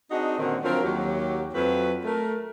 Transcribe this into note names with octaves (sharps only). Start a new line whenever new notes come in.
C4 D4 D#4 F#4 G#4 D#5
A#2 D3 D#3 C4 C#4 F#4
D3 F3 F#3 C4 A#4
D#2 F#3 G4
F2 F#3 B4
A3 A#4